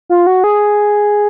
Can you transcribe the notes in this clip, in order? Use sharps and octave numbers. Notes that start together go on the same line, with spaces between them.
F4
F#4
G#4